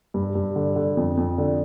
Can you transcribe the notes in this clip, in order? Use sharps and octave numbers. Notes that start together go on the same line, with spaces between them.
G2
G2
D3
D3
F2
F2
D3